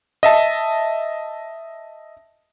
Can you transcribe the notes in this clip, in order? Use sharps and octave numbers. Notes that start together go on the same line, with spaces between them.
D#5 E5 A5